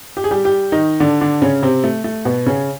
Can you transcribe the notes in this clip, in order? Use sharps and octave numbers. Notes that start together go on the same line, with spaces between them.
G4
G#4
G3 G4
G3 G4
D#3 D#4
D3 D4
D3 D4
C#3 C#4
C3 C4
A3
A3
B2 B3
C#3 C#4